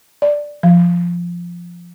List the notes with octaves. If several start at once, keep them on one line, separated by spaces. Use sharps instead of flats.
D5
F3